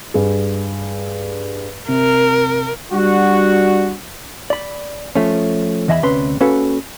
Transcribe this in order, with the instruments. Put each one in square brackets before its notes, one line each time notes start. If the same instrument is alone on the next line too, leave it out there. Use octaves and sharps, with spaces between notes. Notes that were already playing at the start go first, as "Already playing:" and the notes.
[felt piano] G2 G#4
[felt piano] C3 [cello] A#4
[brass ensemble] G3 D4 F#4
[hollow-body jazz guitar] D5 B5
F3 A3 C#4
E2 E3 D#5 E5 G#5 B5
D2 C3 C#4 B4 C6
A#3 C#4 F#4 A4 B4